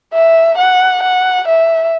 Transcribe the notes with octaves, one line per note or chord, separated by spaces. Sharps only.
E5
F#5
F#5
E5